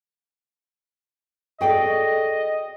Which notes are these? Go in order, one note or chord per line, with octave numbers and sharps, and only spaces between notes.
F#4 G#4 A4 D5 D#5 G5